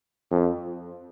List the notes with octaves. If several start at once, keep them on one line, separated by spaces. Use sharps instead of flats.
F2